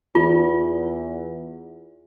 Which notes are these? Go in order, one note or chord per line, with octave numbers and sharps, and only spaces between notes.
E2 F4